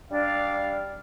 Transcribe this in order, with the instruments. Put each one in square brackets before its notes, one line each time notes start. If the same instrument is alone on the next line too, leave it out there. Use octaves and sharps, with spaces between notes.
[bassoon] G3 [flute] D4 [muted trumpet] F5